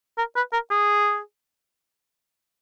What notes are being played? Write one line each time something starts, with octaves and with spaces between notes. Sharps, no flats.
A#4
B4
A#4
G#4